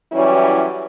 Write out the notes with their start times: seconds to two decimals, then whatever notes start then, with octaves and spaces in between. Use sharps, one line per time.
0.12 E3 F#3 G3 C#4 E4